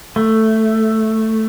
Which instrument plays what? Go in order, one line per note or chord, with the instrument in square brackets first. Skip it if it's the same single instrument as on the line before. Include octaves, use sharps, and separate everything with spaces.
[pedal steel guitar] A3